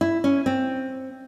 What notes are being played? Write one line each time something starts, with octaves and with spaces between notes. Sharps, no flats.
E4
C#4
C4